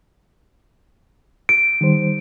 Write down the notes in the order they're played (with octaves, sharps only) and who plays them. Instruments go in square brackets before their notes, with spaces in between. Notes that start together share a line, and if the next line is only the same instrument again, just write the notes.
[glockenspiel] D7
[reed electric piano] D#3 G3 C5